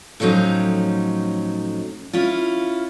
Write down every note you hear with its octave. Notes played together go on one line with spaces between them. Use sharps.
A2 F3 F#3 C#4 D#4
C#4 E4 F4